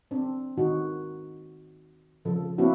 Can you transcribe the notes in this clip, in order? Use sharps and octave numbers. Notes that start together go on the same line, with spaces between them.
C4 D4
D#3 D#4 F#4
C#3 F3 A4
A#3 C4 D4 E4 F#4